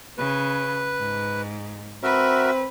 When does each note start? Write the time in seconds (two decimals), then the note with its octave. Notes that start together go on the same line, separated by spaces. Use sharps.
0.18 C#3 B4
0.99 G#2
2.03 C4 F#4 A#4 B4 E5